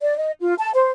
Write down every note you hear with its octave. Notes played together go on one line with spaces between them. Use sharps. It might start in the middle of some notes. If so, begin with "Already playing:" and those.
D5
D#5
F4
A5
C5